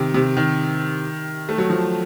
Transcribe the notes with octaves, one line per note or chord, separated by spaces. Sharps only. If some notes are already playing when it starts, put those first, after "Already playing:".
Already playing: C3 D#3
C3
D#3
A3
F#3
F3